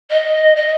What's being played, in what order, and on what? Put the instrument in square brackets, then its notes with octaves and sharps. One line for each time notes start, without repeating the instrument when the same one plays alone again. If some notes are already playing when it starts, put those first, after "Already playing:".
[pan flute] D#5
D#5